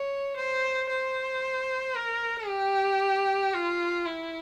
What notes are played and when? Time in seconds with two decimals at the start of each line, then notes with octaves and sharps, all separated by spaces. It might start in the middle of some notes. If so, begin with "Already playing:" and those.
Already playing: C#5
0.37 C5
0.89 C5
1.95 A#4
2.47 G4
3.54 F4
4.06 E4